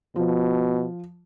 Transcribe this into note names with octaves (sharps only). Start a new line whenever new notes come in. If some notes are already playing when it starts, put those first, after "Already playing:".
B2 F3